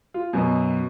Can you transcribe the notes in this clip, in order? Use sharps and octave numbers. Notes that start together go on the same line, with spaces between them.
F4
F#2 B2 D#5